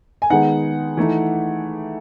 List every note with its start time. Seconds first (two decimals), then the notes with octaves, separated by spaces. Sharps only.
0.22 G#5
0.30 D#3 G#3 B3 D#4 F#5
0.97 E3 A3 D#4